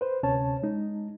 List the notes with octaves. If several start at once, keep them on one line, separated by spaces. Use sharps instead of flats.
B4 C5
D2 C3 C#4 C#5 A5
G#3 D#4